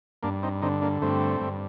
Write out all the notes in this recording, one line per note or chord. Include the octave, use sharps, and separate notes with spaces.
G2 A#3 D4
C4 D#4
D3 C4 D#4
A#3 D4
G2 A3 C4
G2